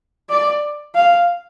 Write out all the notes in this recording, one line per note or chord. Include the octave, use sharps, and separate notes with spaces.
D5
F5